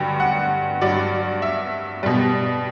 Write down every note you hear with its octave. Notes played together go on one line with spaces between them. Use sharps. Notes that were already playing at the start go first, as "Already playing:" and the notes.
Already playing: G2 D3 F#3 G5
F#5
G2 F#3 D5
E5
B2 G3